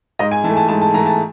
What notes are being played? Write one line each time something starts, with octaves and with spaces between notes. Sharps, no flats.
G#2 D#5
G#5
E3 A5
A3
A5
G#2 A5
A5
E3 A3 A#5
A5